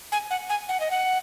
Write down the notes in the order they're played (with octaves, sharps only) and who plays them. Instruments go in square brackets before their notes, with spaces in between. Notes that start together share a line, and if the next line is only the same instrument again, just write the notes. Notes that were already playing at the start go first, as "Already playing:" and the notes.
[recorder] G#5
F#5
G#5
F#5
D#5
F#5